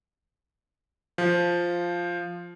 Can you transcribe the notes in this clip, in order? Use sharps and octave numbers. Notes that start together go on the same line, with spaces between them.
F3